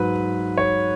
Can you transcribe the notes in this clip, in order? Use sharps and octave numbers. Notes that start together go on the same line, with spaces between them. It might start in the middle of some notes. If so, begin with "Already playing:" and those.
Already playing: G#2 F#3 B4
C#5